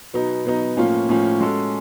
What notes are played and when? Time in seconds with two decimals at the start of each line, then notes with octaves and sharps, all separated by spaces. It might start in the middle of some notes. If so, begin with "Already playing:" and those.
0.14 B2 F#3 B3 D#4
0.45 B2 F#3 B3 D#4
0.77 A2 F3 A#3 C#4 F4
1.09 A2 F3 A#3 C#4 F4
1.40 G#3 C#4 F#4 A4